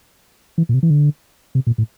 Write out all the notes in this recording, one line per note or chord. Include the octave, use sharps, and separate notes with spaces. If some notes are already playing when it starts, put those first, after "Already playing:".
E3
A#2
C3
E3
D3
C3
A#2
A2